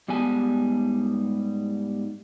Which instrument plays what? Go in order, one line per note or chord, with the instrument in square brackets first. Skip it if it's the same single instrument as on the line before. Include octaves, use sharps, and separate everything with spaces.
[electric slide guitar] G#2 G3 B3 G#5 A5